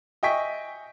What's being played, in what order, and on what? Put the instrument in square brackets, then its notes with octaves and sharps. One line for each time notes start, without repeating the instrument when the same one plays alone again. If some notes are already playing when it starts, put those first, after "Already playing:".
[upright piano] D#5 E5 G5 G#5 C#6 B6